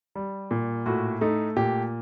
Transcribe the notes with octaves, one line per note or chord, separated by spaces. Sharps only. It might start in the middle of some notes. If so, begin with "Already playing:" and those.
G3
A#2
A2 F#4
A3 D#4
A#2 G4